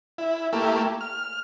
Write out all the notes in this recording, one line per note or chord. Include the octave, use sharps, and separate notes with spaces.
E4
A3 A#3 E4 G4
F6